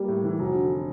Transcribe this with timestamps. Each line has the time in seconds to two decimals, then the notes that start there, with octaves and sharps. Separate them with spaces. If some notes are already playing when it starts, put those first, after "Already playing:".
Already playing: G3 A#3 G4
0.08 A2
0.24 E3
0.39 F1 F#4
0.55 D3